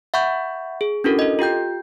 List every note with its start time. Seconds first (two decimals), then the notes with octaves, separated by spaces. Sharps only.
0.14 E5 F#5 B5 C#6 G6
0.81 G#4
1.04 C#4 D4 E4 F#4 A4 A#4
1.19 A4 D#5
1.39 F4 G4 G5 G6